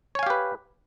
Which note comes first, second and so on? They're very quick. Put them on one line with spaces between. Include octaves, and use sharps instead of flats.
C#5 G#5 F5 G4 B4